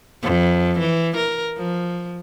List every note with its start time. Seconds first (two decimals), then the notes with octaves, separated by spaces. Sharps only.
0.23 F2
0.79 E3
1.17 A#4
1.58 F3